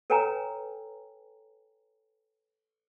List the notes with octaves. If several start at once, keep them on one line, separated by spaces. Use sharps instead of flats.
A4 B4 C#5 G5 G#5 A#5